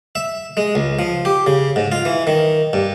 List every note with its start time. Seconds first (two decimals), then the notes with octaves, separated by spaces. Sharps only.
0.15 E5
0.57 G#3
0.75 C#2
0.99 F3
1.25 G4
1.47 C#3
1.76 G#2
1.92 F4
2.05 E3
2.27 D#3
2.73 G2